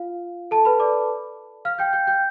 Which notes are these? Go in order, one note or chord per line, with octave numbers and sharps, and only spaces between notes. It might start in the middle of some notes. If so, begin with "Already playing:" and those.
Already playing: F4 F5
A4 A5
B4 B5
D5 D6
F5 F6
G5 G6
G5 G6
G5 G6